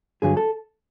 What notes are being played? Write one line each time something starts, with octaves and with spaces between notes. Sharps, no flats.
G2 D3 F#3 G#4
A4